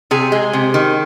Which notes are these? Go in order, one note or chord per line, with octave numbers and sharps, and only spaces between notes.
C3 G#4
G#3
C3
D#3